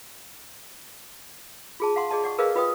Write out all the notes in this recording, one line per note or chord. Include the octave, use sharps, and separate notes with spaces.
F4 G#4 A5
F5 F#5 C6
G#4 D5 D#5 A5
D5 F#5 C#6
G#4 A#4 B4 D5 D#5 F5
F4 B4 D#5 G5 D#6